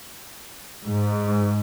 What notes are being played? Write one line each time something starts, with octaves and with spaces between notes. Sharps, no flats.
G#2